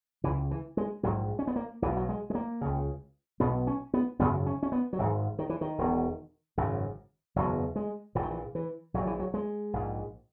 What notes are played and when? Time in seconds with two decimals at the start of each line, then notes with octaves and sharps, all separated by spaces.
0.24 C#2 C#3 E3
0.51 E3
0.77 G#3
1.03 A#1 G#2 F#3
1.39 C#4
1.47 B3
1.56 A#3
1.82 B1 B2 E3
1.97 F#3
2.09 G#3
2.30 G#3
2.35 A#3
2.61 C#2 C#3
3.40 B1 B2 B3
3.67 C#4
3.94 B3
4.19 G#1 F#2 C#3 B3
4.46 C#4
4.63 C#4
4.72 B3
4.93 F#3
4.99 G#1 G#2 E3
5.39 D#3
5.49 E3
5.61 D#3
5.78 E1 E2 B2
6.57 G#1 F#2 C#3
7.36 F#1 E2 B2 F#3
7.76 G#3
8.15 A#1 A#2 E3
8.23 D#3
8.31 E3
8.55 E3
8.94 A#1 A#2 F#3
9.07 E3
9.20 F#3
9.34 G#3
9.73 A#1 G#2